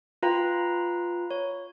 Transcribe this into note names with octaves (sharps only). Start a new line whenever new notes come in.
F4 B4 F5 G5 A#5 B5
C#5